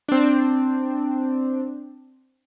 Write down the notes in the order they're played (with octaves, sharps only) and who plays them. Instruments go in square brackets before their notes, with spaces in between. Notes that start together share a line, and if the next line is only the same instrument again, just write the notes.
[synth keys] C4 D4